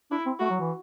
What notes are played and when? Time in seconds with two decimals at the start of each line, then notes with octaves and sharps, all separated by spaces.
0.11 D4 E4
0.26 C4
0.40 A3 F#4
0.50 F#3
0.60 E3